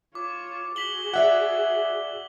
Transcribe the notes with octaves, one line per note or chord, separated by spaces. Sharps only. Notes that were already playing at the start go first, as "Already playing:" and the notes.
F4 C#5 D6
F#4 G#4 B6 F#7 G7
D5 E5 F#5